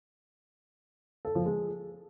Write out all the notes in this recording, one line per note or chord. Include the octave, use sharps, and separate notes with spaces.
A4
F3
G#3